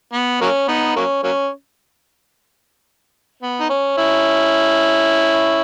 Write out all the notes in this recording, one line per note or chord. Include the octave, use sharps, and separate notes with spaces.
B3
F#3 A#3 C#4
B3 D#4
F#3 A#3 C#4
F#3 A#3 C#4
B3
D#4
C#4
C#4 E4